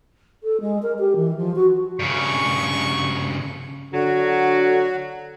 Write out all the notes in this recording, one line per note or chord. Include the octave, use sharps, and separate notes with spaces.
A4
G#3
A#4
G4
E3
F3
F#4
G2 C#3 C#6
D3 F#3 F#4